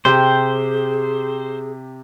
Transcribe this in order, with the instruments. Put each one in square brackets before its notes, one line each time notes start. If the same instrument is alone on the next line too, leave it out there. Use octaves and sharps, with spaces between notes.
[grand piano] C3 G4 [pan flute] G#4 [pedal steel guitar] C5 [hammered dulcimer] G5